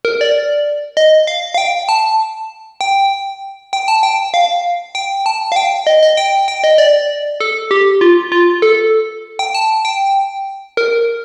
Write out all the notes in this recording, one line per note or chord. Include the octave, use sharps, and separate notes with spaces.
A#4
D5
D#5
F5
F5
G5
A5
G5
G5
A5
G5
F5
G5
A5
F5
G5
D#5
D#5
G5
G5
D#5
D5
A4
G4
F4
F4
A4
G5
A5
G5
A#4